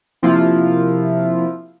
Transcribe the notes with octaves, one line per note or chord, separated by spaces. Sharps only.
C3 F3 A#3 E4 F4